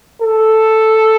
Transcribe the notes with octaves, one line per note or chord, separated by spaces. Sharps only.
A4